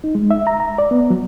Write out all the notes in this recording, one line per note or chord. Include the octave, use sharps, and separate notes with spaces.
D#4
G#3
E5
A#5
A#5
D5
B3
F#3